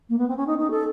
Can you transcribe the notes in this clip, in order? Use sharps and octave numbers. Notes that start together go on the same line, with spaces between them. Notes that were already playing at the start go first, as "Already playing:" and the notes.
A#3
B3
C4
C#4
D#4
D#4
A4